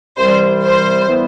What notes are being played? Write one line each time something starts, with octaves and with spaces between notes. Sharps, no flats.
C2 C3 E3 G3 C5
C5
E3 G3 B3